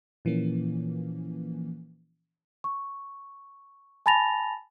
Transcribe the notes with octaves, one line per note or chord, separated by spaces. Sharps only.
A#2 E3 F3 A#3 C#4
C#6
G#5 A5 B5 A6 A#6 F7